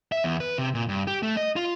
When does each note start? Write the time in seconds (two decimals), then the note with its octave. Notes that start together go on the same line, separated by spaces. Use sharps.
0.12 E5
0.24 E2
0.40 B4
0.58 C3
0.75 A#2
0.88 G2
1.07 G4
1.23 A3
1.37 D#5
1.56 F4